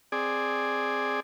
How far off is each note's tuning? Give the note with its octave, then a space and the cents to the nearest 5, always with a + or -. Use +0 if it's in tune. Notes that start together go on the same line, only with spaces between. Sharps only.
C4 +5 G#4 +0 D5 +0